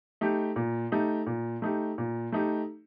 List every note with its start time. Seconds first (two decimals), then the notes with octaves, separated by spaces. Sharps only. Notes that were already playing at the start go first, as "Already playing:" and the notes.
0.21 A3 D#4 G4
0.56 A#2
0.92 A3 D#4 G4
1.27 A#2
1.62 A3 D#4 G4
1.98 A#2
2.32 A3 D#4 G4